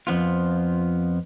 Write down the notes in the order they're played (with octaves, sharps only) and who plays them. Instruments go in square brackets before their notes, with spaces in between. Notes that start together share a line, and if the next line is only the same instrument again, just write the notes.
[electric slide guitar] F2 F3 B3 F4